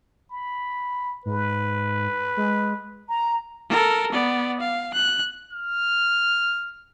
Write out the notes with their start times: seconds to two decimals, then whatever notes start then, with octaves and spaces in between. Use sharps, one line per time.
0.30 B5
1.25 G#2 B4
2.37 G#3
3.09 A#5
3.70 A4 A#4
4.12 B3 D5
4.60 F5
4.94 F#6
5.53 F6